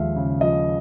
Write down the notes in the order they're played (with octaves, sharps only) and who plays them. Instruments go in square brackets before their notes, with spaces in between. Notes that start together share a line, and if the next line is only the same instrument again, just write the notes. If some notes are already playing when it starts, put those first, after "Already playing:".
Already playing: [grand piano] D#2 F3 G#3 E5 F5
C#3
F3 D#5